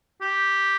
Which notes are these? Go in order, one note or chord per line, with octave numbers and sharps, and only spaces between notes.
G4